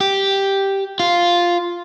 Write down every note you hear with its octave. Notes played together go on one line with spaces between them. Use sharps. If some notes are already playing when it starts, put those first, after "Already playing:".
G4
F4